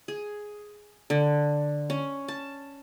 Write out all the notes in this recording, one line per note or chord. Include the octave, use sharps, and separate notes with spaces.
G#4
D3
C#4
A5